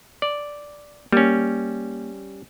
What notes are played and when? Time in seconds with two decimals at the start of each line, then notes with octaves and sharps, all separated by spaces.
0.22 D5
1.12 G3 A#3 C#4